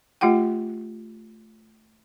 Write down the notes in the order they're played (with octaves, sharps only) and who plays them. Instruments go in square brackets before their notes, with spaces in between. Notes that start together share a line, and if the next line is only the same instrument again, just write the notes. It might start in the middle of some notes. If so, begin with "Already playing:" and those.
[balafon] A3 F4 G4 F#5 G5